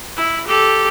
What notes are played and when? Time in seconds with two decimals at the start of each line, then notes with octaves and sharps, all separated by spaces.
0.17 E4
0.48 G4 A4